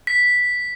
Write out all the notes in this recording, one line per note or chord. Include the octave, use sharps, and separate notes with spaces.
B6